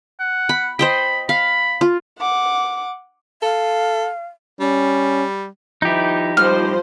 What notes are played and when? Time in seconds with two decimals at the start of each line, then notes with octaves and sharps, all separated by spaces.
0.20 F#5
0.49 B5
0.79 C5 D#5 G5 B5
1.29 F5 B5
1.81 F4
2.19 F#5 D6
3.42 A4 F5
4.61 G3 C#4
5.82 F3 D#4 E4 G4
6.37 F#2 A2 F3 G3 C5 F6